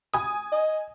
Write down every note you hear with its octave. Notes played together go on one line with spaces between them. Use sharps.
G#5 D#6
D#5